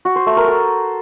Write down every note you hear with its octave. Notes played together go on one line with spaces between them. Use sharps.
F#4
C5
A3
A#4
A4